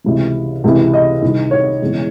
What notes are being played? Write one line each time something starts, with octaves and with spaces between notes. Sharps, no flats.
C#2 C3 E3
C#2 C3 E3
D#5
C2 C3 D#3
C#5
E1 E2 C#3